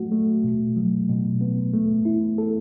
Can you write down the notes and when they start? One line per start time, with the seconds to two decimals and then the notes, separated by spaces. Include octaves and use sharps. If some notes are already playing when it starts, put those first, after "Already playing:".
Already playing: F#3 A3 F#4
0.12 A3
0.44 B2
0.76 F#3
1.09 B2
1.41 B3
1.73 A3
2.05 E4
2.38 A4